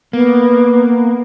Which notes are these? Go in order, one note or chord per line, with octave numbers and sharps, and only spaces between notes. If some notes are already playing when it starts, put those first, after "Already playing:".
A#3 B3